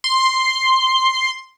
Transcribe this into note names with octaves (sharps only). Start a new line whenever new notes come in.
C6